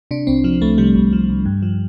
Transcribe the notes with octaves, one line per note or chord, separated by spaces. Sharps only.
C3 D4
C2 C4
F3
C2 A3
C3 G3
C2
F3
C2
G2
F3